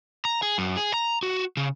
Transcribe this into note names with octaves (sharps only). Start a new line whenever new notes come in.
A#5
G#4
F#2
G#4
A#5
F#4
C#3